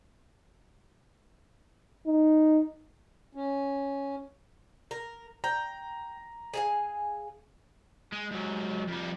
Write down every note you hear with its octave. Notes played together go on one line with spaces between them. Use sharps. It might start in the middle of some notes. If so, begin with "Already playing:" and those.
D#4
C#4
A#4
G5 A#5
G#4 F5 G#5
G#3
G#2 F#3
F2 G3